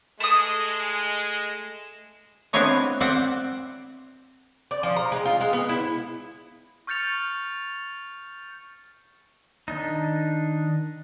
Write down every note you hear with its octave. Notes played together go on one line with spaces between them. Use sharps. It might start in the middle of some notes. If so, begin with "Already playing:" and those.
G#3 A3 D#6 E7
B3 C4 D4 E4 C#5 D#5
C4 D5 E5 F#5 G5
D5
F3
A#5
G#3
F4
G#3
B3
E4
C#6 F6 G6 A6 C#7 F7
D#3 D4 D#4